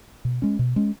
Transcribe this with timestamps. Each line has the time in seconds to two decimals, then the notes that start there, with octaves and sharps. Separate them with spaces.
0.25 B2
0.42 G#3 C#4
0.59 B2
0.76 G#3 C#4